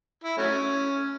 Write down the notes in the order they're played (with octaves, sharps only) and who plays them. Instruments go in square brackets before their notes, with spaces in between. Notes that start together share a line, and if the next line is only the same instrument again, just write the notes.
[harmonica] E4
F#3 A3 C#4